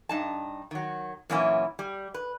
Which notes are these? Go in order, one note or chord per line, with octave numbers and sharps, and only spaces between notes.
G2 D#4 A5
D#3 F#3
F#2 A#2 E3 A#3 C#4 E4
G3
B4